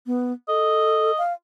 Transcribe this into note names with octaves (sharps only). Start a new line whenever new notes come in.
B3
A4 D#5
F5